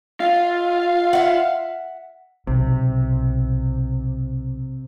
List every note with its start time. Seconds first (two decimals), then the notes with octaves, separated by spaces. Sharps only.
0.20 F4 F5
1.13 E5 F#5
2.47 B1 C3